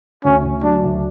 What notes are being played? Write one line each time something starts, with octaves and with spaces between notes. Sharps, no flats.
D2 C#4
D2
F#3 D4
D2